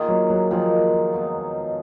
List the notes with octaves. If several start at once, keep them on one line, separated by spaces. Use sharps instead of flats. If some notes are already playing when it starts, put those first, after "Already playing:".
Already playing: D#3 A#3 F4 G#4
F#3
F#3
D#3 F3 A#3 F4 G#4
B2 G#3 D#4